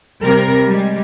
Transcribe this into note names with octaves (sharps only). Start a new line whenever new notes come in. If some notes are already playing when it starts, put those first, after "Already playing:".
C3 G3 A#4
G3 G#3